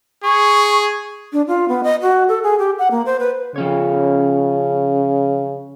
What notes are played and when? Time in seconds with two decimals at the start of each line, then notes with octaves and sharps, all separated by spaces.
0.24 G#4 C#6
1.33 D4
1.48 F4
1.68 B3
1.84 D#5
2.02 F#4
2.28 A4
2.43 G#4
2.59 G4
2.79 F#5
2.91 A#3
3.06 C5
3.20 B4
3.56 C#3 F3 C#4 C#5